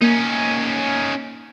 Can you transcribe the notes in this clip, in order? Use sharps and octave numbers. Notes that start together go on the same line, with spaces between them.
A#3 C#4 D#4